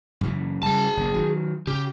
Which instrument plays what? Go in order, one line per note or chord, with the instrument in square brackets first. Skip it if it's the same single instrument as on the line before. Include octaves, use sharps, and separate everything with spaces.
[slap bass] F#2 C#3 E3
[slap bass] C#3 G3 [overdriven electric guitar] G#4 A5
[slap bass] F#1 A#2
D#3 F#3
[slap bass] C#3 [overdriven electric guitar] G4